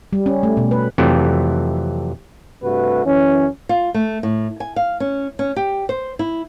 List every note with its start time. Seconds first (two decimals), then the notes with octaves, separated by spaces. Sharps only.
0.13 G3
0.26 C#4
0.43 A3
0.57 B2
0.71 B4
0.98 F2 C3 E3 F#3 A3
2.63 G2 C3 A3 F#4 B4
3.05 F#2 E3 C#4
3.69 F4
3.94 A3
4.23 A2
4.60 G#5
4.76 F5
5.00 C#4
5.39 C#4
5.56 G4
5.89 C5
6.19 E4